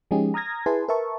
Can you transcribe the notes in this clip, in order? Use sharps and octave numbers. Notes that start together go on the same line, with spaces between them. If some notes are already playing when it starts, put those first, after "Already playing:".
F3 G#3 C#4 D#4 G4 G#4
A#5 D#6 F6 G#6 A#6
E4 G#4 B4 G#5 A5 C6
A#4 B4 E5 A5 C#6